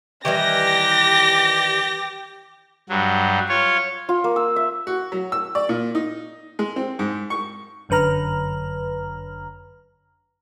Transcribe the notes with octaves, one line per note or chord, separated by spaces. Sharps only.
D#3 E3 G3 G4 A#6
G2 F#3
F4 C#5
F4
A#3
E6
E5
F#4
F#3
E6
D5
A#2
D#4
G#3
C4
G#2
C#6
G1 F#2 D3 B4 A#5 F6